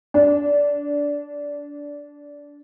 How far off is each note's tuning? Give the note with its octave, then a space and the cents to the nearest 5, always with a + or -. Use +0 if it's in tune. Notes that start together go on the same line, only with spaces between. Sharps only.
D4 -20